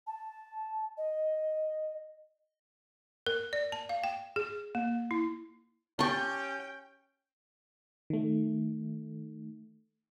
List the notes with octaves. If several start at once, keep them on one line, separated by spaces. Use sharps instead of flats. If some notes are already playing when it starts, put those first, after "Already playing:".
A5
D#5
A#4
D5
A5
F5
G5
G#4
A#3
E4
C#4 G4 G5 A5 C6 C#6
D#3 A3